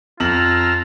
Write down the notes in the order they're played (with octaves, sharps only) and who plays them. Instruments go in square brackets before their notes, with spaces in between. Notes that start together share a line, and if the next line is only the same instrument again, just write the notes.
[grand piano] F2 F#7 [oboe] F4 [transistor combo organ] A#5 E6 F6